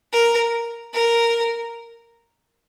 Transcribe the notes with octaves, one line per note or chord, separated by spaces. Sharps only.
A#4
A#4